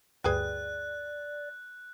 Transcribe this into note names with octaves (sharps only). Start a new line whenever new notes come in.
D2 G2 G#4 B4 D5 G5 F#6 G#6